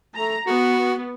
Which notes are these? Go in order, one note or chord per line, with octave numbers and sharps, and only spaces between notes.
A3 A#5
B3 F#4